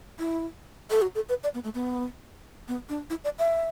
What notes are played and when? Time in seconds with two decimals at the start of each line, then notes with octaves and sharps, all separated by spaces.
0.19 E4
0.90 A4
1.02 F#4
1.15 A4
1.29 B4
1.44 D5
1.54 B3
1.64 A3
1.75 B3
2.68 B3
2.89 D4
3.10 E4
3.24 D5
3.39 E5